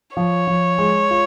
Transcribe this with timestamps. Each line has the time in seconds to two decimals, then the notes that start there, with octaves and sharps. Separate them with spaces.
0.17 F3 C#5
0.47 F3
0.78 G#3
1.10 F4